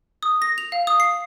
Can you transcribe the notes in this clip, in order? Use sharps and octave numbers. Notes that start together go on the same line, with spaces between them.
D#6
A#6
F7
F5
D#6
C7